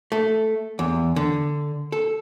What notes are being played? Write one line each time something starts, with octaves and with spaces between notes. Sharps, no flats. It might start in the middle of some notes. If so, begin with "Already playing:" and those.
A3
E2
D3
A4